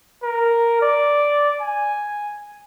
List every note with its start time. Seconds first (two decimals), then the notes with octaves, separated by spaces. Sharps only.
0.23 A#4
0.82 D5
1.61 G#5